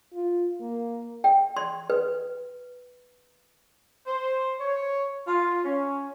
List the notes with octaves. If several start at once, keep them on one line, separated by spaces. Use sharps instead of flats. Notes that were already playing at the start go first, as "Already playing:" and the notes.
F4
A#3
G5
C6
B4
C5
C#5
F4
C#4